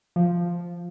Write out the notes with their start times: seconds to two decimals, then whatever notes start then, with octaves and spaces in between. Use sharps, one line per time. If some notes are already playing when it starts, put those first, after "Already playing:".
0.16 F3